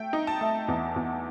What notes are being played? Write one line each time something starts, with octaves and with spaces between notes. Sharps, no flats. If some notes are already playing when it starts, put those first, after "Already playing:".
Already playing: A3 G5
D#4
A5
A3
E2
E2